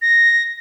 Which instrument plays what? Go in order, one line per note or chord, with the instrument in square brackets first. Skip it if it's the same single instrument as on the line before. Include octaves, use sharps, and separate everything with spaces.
[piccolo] A#6